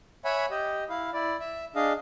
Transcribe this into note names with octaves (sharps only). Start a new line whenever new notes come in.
C#5 E5 F#5 G#5 B5
G4 D#5
E4 F5
E4 D5
E5
D4 G#4 D#5 F5